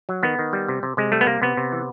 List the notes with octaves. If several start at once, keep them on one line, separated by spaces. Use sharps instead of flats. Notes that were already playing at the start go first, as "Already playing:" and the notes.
F#3
D#3 B3
D#3
G3
C3
C3
C3 G#3
G3 A3
B3
C3 A#3
C3 B3
C3
E3